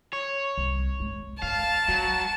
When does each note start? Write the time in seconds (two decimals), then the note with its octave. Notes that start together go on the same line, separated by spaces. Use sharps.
0.13 C#5
0.58 C2
1.00 G#3
1.42 D3 F5 A5
1.88 F#3 G3